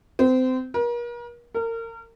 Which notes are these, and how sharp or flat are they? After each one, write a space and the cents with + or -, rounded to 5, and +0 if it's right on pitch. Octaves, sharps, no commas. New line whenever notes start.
C4 -30
A#4 +40
A#4 -30